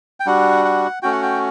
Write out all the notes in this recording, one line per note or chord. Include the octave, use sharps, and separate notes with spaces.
G5
G3 D4 F#4 F#5
F#5
A3 C#4 F#4 G5
F#5
G5